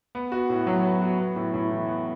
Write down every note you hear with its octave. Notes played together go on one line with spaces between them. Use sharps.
B3
F#4
A2
F#3
B3
F#4
B3
A2
A2
E3
B3